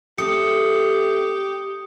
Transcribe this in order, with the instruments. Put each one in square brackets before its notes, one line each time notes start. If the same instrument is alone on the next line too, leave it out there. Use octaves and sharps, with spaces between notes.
[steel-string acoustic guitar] A3 C4 [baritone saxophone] G4 [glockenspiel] D#6 C#7